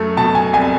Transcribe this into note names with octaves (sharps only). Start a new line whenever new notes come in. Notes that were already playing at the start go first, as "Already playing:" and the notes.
Already playing: F#2 A3
B2 A5
G#5
C2 G#5